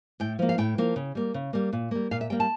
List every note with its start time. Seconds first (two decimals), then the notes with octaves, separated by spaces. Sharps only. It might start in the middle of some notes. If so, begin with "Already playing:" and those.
0.20 A2 G5
0.39 F3 A#3
0.49 F5
0.58 A2 G5
0.78 F3 A#3
0.96 C#3
1.15 G3 A#3
1.34 C#3
1.53 G3 A#3
1.73 A#2
1.91 G3 A#3
2.11 A#2 F5
2.21 E5
2.30 G3 A#3 G5
2.40 A5